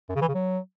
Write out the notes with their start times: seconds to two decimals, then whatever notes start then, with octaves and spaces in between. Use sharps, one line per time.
0.09 F#2
0.15 C#3
0.22 E3
0.28 C#3
0.34 F#3